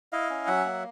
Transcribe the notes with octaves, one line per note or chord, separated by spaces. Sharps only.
E4 D#5 F5
C#4
F#3 E5 F#5
A#3